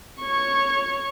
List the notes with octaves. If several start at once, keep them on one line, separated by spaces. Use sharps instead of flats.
C#5 C#6